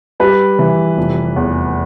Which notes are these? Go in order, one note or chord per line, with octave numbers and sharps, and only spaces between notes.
G3 B4
E3
F1
E2